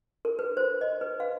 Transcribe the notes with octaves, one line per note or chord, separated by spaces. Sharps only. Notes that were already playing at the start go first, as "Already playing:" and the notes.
A#4
B4
C5
D#5
B4
F5